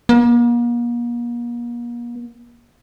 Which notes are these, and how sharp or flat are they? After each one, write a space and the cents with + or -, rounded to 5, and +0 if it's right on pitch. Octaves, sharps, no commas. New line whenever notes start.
A#3 +40